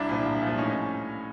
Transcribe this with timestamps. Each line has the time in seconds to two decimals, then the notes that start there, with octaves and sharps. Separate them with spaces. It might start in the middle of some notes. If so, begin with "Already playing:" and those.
Already playing: C2 D4 E4
0.09 A#2 F3
0.26 C2
0.42 A#2 F3
0.58 A2 C#4 D#4